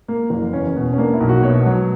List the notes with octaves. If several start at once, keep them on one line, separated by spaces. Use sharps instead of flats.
A#3
F#1
E2 C#4
B2
C#4
A#3 D4
E4
B1
F#4
B2 C#5
F#3